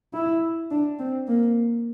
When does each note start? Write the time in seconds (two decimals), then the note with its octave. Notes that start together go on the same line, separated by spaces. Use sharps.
0.14 E4
0.71 D4
0.99 C4
1.28 A#3